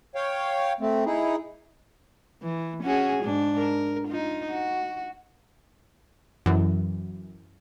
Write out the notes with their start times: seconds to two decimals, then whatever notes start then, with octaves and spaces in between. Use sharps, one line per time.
0.15 C#5 F5 G5
0.80 A3 C4
1.06 D#4 E4 G#4
2.42 E3
2.83 C#4 F#4 G#4
3.23 G#2 D4
3.57 A#4
4.08 D#4 F4
4.51 F#4
6.46 F#2 E3